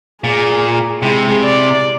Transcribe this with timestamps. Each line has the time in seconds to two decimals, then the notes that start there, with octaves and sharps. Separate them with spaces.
0.24 A#2 G#4
1.02 C3 G#3 E4
1.45 D5